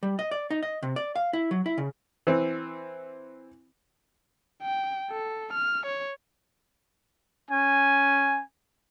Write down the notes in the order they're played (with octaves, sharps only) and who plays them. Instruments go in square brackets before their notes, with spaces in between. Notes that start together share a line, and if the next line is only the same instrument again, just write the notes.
[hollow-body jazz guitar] G3
D#5
D5
D#4
D#5
C3
D5
F5
E4
F#3
E4
C#3
[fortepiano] E3 C4
[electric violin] G5
A4
F6
C#5
[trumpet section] C#4 G#5